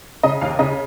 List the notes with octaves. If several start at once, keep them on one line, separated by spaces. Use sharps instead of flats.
C#3 D#5
D#2 F5
C#3 D#5